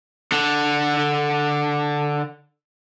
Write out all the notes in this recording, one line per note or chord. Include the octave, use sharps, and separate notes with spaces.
D3 D4